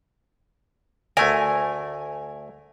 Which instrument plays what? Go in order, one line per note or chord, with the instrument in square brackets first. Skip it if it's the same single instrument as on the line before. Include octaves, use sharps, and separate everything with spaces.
[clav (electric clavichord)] D2 A3 A#4 [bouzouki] G#5